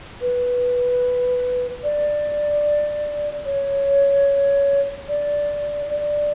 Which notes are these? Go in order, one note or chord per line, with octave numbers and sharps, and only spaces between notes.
B4
D5
C#5
D5
D5